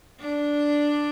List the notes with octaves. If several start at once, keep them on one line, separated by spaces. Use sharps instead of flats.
D4